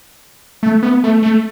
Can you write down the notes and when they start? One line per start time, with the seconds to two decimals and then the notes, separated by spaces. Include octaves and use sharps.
0.63 A3
0.83 B3
1.04 A3
1.23 A3